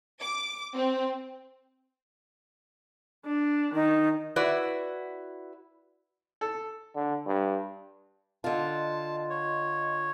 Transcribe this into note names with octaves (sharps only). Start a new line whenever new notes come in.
D6
C4
D4
D#3 D#4
E4 F#4 B4 D5
A4
D3
G2
D3 F4 D#5 A5 C6
C#5